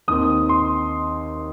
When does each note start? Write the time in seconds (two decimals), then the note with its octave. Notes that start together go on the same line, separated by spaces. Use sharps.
0.08 D#2 D#3 C4 D#6
0.49 C6